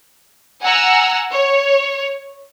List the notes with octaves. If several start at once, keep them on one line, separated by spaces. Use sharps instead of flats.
F#5 G#5 A#5 E6
C#5